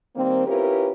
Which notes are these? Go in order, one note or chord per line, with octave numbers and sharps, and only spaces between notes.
D#3 G3 A#3 C4
C#4 E4 F4 G4 A#4 B4